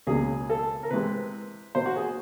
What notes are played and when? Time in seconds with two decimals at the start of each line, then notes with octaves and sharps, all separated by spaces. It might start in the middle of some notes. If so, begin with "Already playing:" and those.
0.07 C#2 B2 F#3 A#3 C#4 G#4
0.50 A4
0.83 A#4
0.91 C3 E3 G#3 C4 B4
1.75 A#2 F#3 A#3 C5
1.86 F#4
1.96 G#4